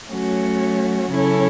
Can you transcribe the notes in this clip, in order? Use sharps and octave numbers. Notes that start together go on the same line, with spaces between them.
F#3 A3 C#4 F#4
C#3 F#3 C#4 E4 A4